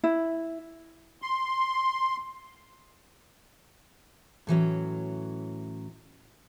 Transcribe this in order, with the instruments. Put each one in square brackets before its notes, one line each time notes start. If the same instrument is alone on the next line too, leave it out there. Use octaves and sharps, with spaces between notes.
[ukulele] E4
[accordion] C6
[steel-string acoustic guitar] A2 E3 F#3 C#4